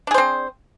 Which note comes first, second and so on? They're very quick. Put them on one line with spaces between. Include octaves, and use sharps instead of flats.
D4 G#4 C5 C4